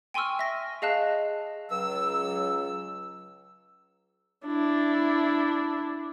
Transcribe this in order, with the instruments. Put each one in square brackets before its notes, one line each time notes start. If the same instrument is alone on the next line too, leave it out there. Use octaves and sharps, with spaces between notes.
[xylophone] G5 G#5 C6 C#6 E6 F6
E5 A#6
G#4 D#5 F5 A5 F#6
[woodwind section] C#2 F#3 E6
[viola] D4 E4